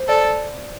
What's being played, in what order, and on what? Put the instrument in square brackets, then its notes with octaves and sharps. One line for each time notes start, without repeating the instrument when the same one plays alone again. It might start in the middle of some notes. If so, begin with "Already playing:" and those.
Already playing: [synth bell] C5
[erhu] A4 [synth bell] D5